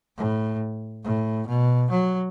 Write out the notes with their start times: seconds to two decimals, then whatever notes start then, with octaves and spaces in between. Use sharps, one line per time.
0.17 A2
1.04 A2
1.47 B2
1.91 F#3